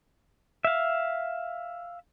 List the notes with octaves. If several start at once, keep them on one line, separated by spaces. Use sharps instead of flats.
E5 F5